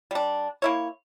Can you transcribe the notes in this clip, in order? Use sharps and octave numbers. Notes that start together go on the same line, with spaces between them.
G3 D4
A#3 E4 C#5